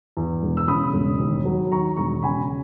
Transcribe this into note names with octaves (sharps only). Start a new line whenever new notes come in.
E2
E1
E6
C#3 B5 D#6
E1
D#2
F#3
D#3 A#5 C#6
E1 A#5 C#6
C#3 G#5 B5